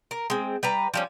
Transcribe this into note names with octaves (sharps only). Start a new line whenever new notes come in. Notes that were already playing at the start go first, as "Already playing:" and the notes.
A#4
G#3 C4
G3 B4 A#5
F3 G3 C#4